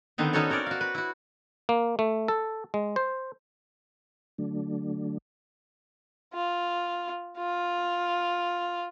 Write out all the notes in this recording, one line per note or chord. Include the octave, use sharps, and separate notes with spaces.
D3 D#3 B3 C4
B3 C#4 D#4 F#4 A4 C#5
C4 A#4 C#5 D5
F#4 F5
B4
E4 F#4
A#3
A3
A4
G#3
C5
D3 F#3 A3 D4
F4
F4